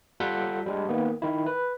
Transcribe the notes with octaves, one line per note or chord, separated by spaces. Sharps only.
G3 F4 A4 F#5 G6 B6
G3 G#3 D4
D#3 A#3 B3
D#3 E4
B4